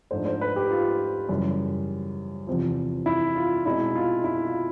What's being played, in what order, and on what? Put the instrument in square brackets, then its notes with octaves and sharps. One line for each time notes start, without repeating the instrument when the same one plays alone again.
[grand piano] G#2 F3 A3 D4 C5
C5
B4
G4
F4
F#2 C#3 E3 G3
E2 C3 F3
E4
F4
B2 G#3 C4 D#4 E4
F4
E4
F4